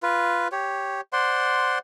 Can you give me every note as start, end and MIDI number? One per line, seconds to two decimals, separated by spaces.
0.03 0.48 65
0.03 0.48 71
0.52 1.01 67
0.52 1.01 73
1.13 1.79 72
1.13 1.79 74
1.13 1.79 78
1.13 1.79 84